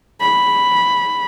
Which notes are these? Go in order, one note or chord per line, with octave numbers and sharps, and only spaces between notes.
B5